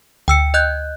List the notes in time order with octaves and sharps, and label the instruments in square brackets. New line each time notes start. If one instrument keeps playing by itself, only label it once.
[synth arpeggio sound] D2 [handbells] G5 E6 C#7
[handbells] D#5 F#6 G6